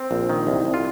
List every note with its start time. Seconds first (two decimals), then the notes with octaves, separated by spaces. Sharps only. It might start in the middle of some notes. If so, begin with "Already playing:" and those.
Already playing: C4
0.11 A#1
0.30 D#3
0.47 C2
0.65 C2
0.74 F4